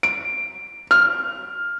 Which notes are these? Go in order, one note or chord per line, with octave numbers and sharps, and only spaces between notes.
D7
F6